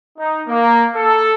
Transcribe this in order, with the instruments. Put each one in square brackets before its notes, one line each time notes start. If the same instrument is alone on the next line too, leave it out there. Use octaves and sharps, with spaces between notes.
[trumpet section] D#4
A#3
A4